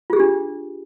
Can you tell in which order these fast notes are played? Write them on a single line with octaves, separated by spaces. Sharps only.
F4 G#4 G4 D4